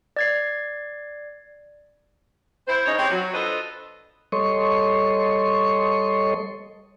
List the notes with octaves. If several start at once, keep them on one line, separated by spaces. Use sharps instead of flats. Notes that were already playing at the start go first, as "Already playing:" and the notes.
D5 G#6 C7
E4 C5
C#3 D#4 C#5
C4 E4 G4 C5 C#5
F#3
D4 F4 A4 B4 C5 D#5
G3 A4 C#5 D#5 C6 C#6